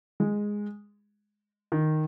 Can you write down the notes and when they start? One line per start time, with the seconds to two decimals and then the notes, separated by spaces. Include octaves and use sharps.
0.20 G#3
1.72 D#3